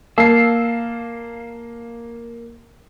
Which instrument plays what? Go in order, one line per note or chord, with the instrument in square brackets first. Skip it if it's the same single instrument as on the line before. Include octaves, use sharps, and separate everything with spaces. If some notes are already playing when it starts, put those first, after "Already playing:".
[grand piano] A#3 C7 [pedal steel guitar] F5 A5 E6